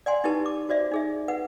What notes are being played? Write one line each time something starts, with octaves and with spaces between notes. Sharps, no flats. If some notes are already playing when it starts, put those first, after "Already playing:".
D5 F#5 G#5 C6
D#4 E4 G4 B4 A5
D6
F#4 C5 D5 E5
D#4 G#4 E5
B4 F#5